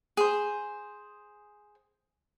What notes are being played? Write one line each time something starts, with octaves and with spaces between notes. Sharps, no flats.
G#4 C5